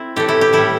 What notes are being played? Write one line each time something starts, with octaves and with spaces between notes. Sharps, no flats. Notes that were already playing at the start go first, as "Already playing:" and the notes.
Already playing: C4 E4
A2 E3 A3 G4
E4
G4
A2 G3 E4